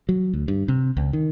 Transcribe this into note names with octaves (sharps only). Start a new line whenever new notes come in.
F#3
D2
G2
C3
C#2
D#3